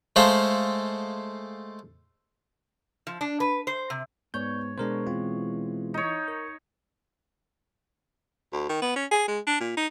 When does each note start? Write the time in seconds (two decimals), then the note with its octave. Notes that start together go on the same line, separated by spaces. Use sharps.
0.16 G#3 A3 A4 C5 F5
3.07 F3
3.21 D4
3.40 B4
3.67 C5
3.90 C3
4.34 G#2 B3 C#5 D5 G6
4.78 B2 G#3 D4 A#4 C5
5.07 E3 C4 F4
5.94 D#4 C#5
6.28 A#4
8.53 D2
8.69 D#3
8.82 B3
8.96 C#4
9.11 G#4
9.28 G#3
9.47 D4
9.60 A#2
9.77 D#4